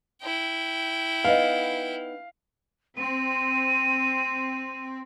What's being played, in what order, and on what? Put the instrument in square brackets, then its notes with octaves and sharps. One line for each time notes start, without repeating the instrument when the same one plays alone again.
[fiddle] E4 G5
[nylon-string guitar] B3 D#4 D#5 [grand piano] F5
[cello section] C4 [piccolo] D#7